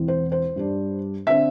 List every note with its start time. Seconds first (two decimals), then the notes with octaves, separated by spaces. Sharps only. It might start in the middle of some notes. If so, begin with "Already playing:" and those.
Already playing: E1 E2 E3 C4 E4
0.08 C5
0.32 C5
0.56 G2 G3 D4
1.27 D3 C4 E5